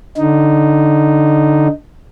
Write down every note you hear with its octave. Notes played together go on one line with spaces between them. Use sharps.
D3 D#4